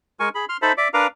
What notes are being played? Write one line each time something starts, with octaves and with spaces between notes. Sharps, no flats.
G#3 A#4 G#5 C#6
G#4 B5
C6 F6
D#4 A4 C5 E5 A5 B5
D5 E5 D6
D4 A#4 B4 F5 A#5 D6